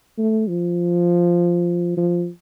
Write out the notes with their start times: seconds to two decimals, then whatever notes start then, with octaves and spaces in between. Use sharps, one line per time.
0.18 A3
0.48 F3
1.97 F3